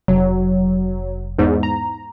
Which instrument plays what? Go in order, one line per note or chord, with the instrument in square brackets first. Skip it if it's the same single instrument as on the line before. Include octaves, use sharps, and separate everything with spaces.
[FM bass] F1 [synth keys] F#3
[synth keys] E2 G#2
A#5